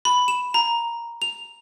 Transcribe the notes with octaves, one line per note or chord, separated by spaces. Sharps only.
B5
E7
A#5
F7